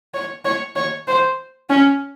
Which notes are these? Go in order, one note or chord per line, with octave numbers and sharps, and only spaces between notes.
C#5
C#5
C#5
C5
C#4